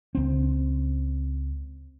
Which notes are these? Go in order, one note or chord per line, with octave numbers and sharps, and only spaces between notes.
C#2 C4